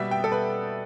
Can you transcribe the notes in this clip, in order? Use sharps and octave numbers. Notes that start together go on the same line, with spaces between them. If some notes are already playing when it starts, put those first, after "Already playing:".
Already playing: B2 G3 B3 E5
G5
A4
B4